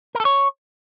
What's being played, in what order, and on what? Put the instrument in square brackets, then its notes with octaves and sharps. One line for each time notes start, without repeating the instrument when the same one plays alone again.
[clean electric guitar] A#4
A4
C#5